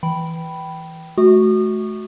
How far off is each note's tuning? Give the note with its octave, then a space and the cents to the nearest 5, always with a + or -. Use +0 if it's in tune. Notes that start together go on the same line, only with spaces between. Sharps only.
E3 +0 G5 -15 B5 +0
A3 -35 F#4 +0 D#6 -40